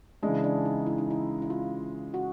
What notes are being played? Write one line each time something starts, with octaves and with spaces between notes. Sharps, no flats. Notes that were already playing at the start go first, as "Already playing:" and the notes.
C#3 E3 G#3 D4
D4
D#4
E4
D#4
E4
E4
F4
F#4